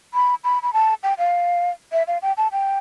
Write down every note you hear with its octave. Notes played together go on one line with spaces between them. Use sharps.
B5
B5
B5
A5
G5
F5
E5
F5
G5
A5
G5